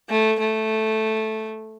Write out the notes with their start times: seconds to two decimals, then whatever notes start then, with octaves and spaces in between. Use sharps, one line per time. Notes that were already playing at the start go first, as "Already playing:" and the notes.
0.09 A3
0.39 A3